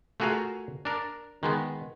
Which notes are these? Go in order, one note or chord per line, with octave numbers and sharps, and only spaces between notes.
A3 F4 F#4 G#4 A#4 F5
D4 A#4
D#3 G#3 B3